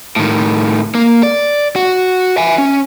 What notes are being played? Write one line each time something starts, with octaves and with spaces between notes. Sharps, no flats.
A2 D#3
A#3
D5
F#4
E5 G#5
C#4